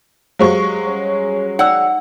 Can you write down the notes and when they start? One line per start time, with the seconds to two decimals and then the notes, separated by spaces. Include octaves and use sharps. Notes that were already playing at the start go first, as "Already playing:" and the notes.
0.39 F#3 G#3 G4 C5 F5 C#6
0.85 G3 C#4 C#5
1.59 D#4 D5 F#5 E6